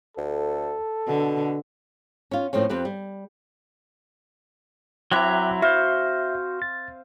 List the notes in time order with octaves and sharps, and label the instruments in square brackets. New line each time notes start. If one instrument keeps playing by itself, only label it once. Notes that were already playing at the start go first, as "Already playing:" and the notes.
[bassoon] D2 [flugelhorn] A4
[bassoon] B2 [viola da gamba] D3
[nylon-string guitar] C#4 F4
A2 F3 C4 C#4
F2 C4 G4 B4
G3
[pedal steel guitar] F#3 E5 A#5 [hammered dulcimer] C4 E4 [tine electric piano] G5 D6 F#6
[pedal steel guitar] F#4 C5 [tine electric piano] E5 [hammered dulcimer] F5
[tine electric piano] A6